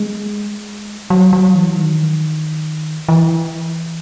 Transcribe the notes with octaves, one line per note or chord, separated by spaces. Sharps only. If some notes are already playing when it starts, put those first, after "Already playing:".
Already playing: G#3
F#3
F#3
E3
D#3
E3